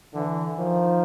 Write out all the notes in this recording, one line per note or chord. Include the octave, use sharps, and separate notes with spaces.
D3 E3
D#3 F3